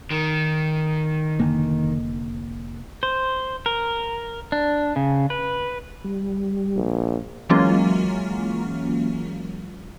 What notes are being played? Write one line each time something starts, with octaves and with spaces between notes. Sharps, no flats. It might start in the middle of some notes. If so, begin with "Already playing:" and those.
D#3
F1 D3 A#3
C5
A#4
D4
C#3
B4
G3
A#1
E3 F#3 G#3 A#3 C#4 F4